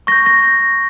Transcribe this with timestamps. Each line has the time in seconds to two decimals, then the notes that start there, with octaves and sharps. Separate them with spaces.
0.07 C#6 G6 A#6
0.26 A#6